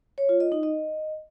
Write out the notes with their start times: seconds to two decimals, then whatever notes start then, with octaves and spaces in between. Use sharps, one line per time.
0.18 C#5
0.29 F4
0.40 D#5
0.52 D#4
0.63 D#5